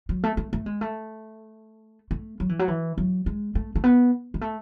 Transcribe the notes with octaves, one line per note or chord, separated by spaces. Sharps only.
F#3
A3
A3
A3
G#3
A3
A3
F#3
E3
F#3
E3
F#3
G#3
A3
A3
B3
G#3
A3